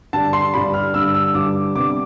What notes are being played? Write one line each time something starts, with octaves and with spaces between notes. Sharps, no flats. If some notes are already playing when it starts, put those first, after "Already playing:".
G2 D3 G3 D4 A5
C6
G2 D3 G3 D4 B5
F6
G2 D3 G3 D4 E6
E6
G2 D3 G3 D4 D6
C3 G3 B3 D4 D6